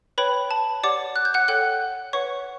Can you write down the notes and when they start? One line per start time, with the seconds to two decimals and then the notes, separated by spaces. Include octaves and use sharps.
0.18 B4 C#5 G5 B5
0.51 A5
0.83 G4 C#5 D5 F#5 D6
1.16 F#6
1.25 G6
1.34 F#5 F#6
1.48 A4 C#5 F#5 G5 F#6
2.13 B4 C#5 F#5 C#6